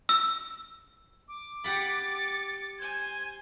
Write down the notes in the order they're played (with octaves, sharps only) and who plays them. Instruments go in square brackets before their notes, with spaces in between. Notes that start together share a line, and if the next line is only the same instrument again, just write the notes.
[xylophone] E6
[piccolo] D6
[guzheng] G4 F#5 B5 [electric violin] A6 C#7
[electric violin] C5 G#5 [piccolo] G#6